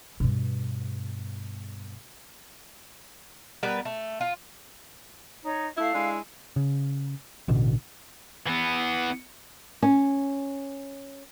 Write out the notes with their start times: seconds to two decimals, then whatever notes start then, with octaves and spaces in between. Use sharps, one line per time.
0.20 G2 B2
3.63 G3 B3 A#4 B4
3.85 A3
4.21 F4
5.43 D#4 C#5
5.77 A3 E4 A4 F5
5.94 G#3 D4 E4
6.56 C#3
7.48 A1 B2 D3
8.47 E3 B3
9.83 C#4